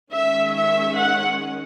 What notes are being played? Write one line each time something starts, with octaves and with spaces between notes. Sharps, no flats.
D#3 G#3 C#4 E5
E5
F#5